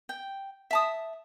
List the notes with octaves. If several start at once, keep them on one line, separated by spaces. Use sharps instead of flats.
G5
E5 A5 D#6